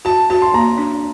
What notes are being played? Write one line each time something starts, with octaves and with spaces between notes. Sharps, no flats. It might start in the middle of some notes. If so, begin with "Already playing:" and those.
F#4 A5
F#4 A5
C6
A#3 A#5
D4